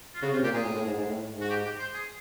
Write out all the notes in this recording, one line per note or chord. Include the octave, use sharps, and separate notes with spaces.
F4
C#3 F#4
C3 F4
A#2 G4
A#2 G#4
A2
A2
G#2
G#2
A2
G#2
F#4
G4
G4
C5
G#4